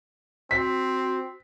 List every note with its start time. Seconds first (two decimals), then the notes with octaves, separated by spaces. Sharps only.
0.51 C4 F#4 B6